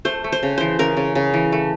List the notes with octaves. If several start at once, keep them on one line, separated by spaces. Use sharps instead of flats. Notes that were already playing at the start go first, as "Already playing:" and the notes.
A3 C5
A3
C5
C#3
E3 C5
C#3 A#4
C#3
C#3
E3
A3